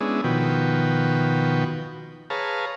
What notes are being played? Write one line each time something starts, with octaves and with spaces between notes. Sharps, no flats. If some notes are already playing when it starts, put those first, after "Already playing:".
G#3 B3 C#4 D4 E4 G#4
B2 D#3 F3 F#4 B4 G5
G#4 B4 C#5 F5 A5 A#5